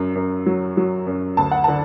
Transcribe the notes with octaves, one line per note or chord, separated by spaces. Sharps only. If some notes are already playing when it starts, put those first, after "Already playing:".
Already playing: F#2 F#3
F#2
F#3
F#3
F#2
D2 A5
F#5
D3 A5